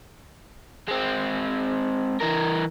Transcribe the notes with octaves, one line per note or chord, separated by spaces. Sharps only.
G#3 C4
E3 A#4